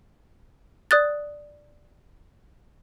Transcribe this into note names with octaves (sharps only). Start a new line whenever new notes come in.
D5 D#6 F#6 A6